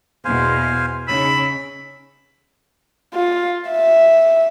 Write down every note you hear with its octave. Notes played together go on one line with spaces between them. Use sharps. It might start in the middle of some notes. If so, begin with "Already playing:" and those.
E2 B2 B3 C5 F5 G#5
C#3 C#4 D#4 B5 E6
F4
E5